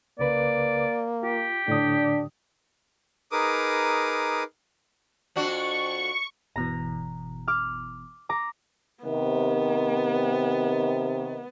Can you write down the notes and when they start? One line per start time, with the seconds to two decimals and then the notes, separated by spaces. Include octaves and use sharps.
0.19 C2 C#3 A#3 B4 D5
1.23 F4 G4
1.68 A2 D3 D4 D#6
3.31 D#4 G#4 A#4 B4 D6 D#6
5.36 F2 D4 F#4 C#6
6.56 G1 B2 E3 A#5
7.48 D6 F6
8.29 A#5 D6
9.04 C3 D#3 B3